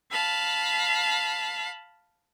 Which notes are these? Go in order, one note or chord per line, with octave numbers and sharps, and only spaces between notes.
F5 A5 B5